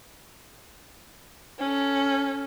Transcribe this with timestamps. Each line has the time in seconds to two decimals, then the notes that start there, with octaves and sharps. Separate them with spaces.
1.59 C#4 A4